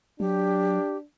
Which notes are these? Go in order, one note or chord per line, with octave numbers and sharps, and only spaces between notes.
F#3 D4 G4